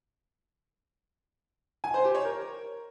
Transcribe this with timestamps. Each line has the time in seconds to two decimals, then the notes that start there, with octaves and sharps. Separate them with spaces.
1.84 G#5
1.94 C5
2.04 G4
2.15 C#5
2.25 A#4